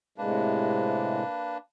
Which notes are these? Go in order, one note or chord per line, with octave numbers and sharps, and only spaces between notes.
A2 C3 G#3 A#3 D4 B4